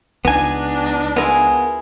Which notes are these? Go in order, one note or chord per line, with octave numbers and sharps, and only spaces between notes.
C#2 B3 D4 D#4 G#5
B3 E4 F4 G#4 A#4